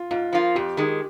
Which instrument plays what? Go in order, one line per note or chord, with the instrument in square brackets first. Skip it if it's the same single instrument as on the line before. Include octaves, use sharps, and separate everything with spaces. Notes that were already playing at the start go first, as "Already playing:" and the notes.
Already playing: [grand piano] F4
[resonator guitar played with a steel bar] G#2 [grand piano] F4
[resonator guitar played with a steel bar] F3 A#3 F4
[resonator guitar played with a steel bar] F2 [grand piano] G4
[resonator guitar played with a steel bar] D#3 G#3